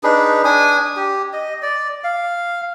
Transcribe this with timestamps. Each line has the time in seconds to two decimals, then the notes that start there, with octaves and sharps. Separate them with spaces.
0.03 D4 D#4 G#4 B4
0.45 D4 G#5 D#6
0.97 G4
1.33 D#5
1.62 D5
2.04 F5